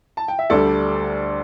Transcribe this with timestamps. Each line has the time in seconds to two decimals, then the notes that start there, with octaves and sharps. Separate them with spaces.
0.17 A5
0.28 G5
0.39 E5
0.50 D2 D3 G3 A4 D5